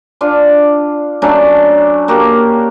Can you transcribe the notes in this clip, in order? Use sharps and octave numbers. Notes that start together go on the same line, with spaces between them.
D4 F4
F#3 A3 C#4 D4
A#3 F#4 G4 A4